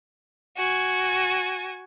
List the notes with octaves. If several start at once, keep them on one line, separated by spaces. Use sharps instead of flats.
F#4 G#5